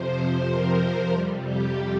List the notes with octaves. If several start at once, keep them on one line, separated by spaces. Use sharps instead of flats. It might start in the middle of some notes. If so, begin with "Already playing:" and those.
Already playing: F2 C3 F3 C5
A#4
F2 C3 G3
G4